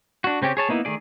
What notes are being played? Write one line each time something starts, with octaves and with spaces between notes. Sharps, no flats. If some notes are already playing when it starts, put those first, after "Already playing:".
D4 F#4
C#3 C4 C#4 G4
G#4 C#5 A5
A#3 B3 D#4 E4
D#3 A3 G#4 D5